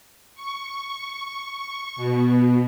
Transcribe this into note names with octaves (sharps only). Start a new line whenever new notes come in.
C#6
B2